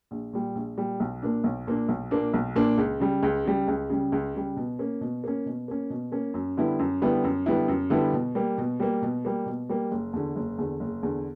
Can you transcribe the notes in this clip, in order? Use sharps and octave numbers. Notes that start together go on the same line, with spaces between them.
A#1
A#2 G3
A#1
A#2 G3
B1
A#2 A#3 D4
B1
A#2 A#3 D4
B1
A#2 A#3 D4
B1
A#2 A#3 D4
C#2
C#3 G3
C#2
C#3 G3
C#2
C#3 G3
C#2
C#3 G3
B2
A#3 C#4
B2
A#3 C#4
B2
A#3 C#4
B2
A#3 C#4
F#2
D3 G3 B3 E4
F#2
D3 G3 B3 E4
F#2
D3 G3 B3 E4
F#2
D3 G3 B3 E4
B2
G3 A#3
B2
G3 A#3
B2
G3 A#3
B2
G3 A#3
F#1
E2 D3
F#1
E2 D3
F#1
E2 D3